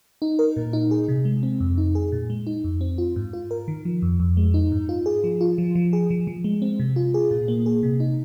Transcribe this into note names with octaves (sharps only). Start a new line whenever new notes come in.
D#4
A#4
A#2
D#4
G#4
C3
G#3
C4
F2
D#4
G#4
A#2
G#3
D#4
F2
C4
F4
G#2
F4
A#4
D#3
F3
F2
F2
G#3
D#4
G#2
F4
G#4
F3
F4
F3
F3
G#4
F3
F3
G#3
C4
C3
F4
G#4
A#2
A#3
G#4
C3
D#4